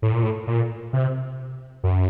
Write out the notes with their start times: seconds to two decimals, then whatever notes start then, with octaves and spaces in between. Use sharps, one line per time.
0.02 A2
0.12 A#2
0.23 A2
0.47 A#2
0.93 C3
1.84 F#2